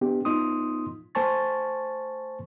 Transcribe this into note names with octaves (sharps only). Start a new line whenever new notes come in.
B3 D4 G4 G#4
A3 B3 D#4 F4 C6 D#6
A3 C5 G#5 A5 C#6 A6